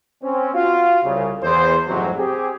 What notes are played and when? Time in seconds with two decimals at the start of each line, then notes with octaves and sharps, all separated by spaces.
0.23 C4 C#4
0.54 F4 F#4 F5
1.03 C2 C#3
1.43 E2 C5
1.88 A1 F2 G#2 C3 F#3
2.18 C4 G4 G#4